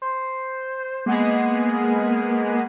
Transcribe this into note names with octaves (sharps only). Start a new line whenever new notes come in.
C5
G#3 A#3 B3 G#4